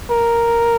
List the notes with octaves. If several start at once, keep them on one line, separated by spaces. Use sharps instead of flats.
A#4